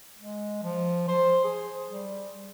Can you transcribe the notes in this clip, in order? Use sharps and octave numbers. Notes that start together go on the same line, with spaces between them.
G#3
F3
C5
G#4
G3